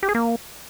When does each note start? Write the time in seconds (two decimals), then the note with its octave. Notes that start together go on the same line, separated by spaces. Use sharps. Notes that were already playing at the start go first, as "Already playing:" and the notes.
0.03 G4
0.09 G#4
0.15 A#3